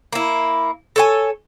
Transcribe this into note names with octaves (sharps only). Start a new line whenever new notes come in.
A#3 E4
A4 C#5 G#5